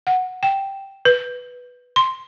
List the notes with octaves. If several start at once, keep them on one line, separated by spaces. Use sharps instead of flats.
F#5
G5
B4
C6